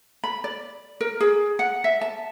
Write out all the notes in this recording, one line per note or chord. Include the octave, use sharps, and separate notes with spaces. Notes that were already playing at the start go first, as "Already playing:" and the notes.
B5
D5
A#4
G#4
F#5
E5
A5